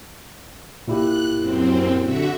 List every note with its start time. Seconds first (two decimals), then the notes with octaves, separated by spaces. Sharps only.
0.88 A#2 E4 G4 F#6
1.35 F#2 C4
2.00 D3 F#4 E5